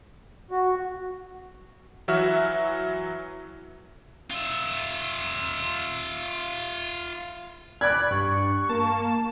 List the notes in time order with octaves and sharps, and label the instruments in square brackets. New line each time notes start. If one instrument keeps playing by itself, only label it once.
[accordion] F#4
[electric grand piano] E3 F#3 F#4 E5 F6
[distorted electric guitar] F4 E5
[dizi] D5 [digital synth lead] B5 [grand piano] F#6 G#6
[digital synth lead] G2 [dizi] C#6
[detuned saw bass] A#3 [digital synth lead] A5